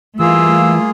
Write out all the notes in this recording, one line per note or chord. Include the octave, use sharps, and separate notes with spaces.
E3 G3 A3 A#3 F4 G#4 E6